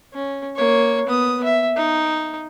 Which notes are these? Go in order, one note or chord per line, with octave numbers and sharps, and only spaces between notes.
C#4
A#3 C#5
B3 D#6
E5
D#4